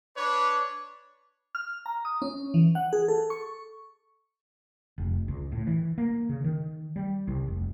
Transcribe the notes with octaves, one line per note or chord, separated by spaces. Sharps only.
D4 B4 C#5 D6
F6
A#5
D#6
C#4
E3
F#5
G#4
A4
C#6
F1
C#2
A2
E3
A#3
C#3
D#3
G3
C2
F1